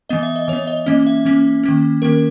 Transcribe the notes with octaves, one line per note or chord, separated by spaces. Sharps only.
E3 B3 D#5
E5
D#5
E3 C#5
B3
D#5
E3 A#3 C#4 D#5
E5
E3 A#3 C#4
D#3 A#3 C#4
D#3 A#3 C#4 A#4